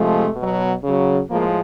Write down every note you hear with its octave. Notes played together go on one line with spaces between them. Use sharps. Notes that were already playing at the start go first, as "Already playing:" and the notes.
Already playing: C3 F3 G#3 A3
B2 F#3
C#3 F#3
A2 F3 G#3 A#3